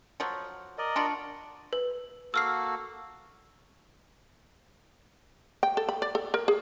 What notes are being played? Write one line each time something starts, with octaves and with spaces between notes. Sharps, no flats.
F3 F#3
A#4 D5 D#5
D4 F4 F#4
B4
A#3 F#4 A4 E6 F6 C7
G5
A4
B5
D5
A4
A#4
G#4